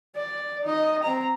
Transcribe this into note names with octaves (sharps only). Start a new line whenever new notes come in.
D5
D#4 D#5
C4 A#5